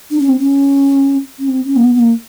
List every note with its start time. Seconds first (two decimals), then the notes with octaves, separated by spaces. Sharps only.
0.11 D4
0.19 C#4
0.28 C4
0.38 C#4
1.39 C#4
1.48 C4
1.65 C#4
1.76 A#3
1.83 B3
1.95 B3
2.00 A#3